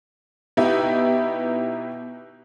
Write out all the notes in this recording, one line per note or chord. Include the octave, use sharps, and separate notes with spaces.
B2 B3 D#4 E4 G4